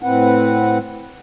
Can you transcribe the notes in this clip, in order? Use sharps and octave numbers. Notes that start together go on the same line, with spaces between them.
A2 C4 B4 F#5